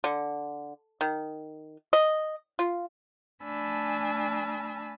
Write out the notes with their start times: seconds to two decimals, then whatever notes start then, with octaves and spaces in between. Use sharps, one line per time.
0.04 D3
1.01 D#3
1.93 D#5
2.59 F4
3.44 A3 D4 G#5 A5 B5 E6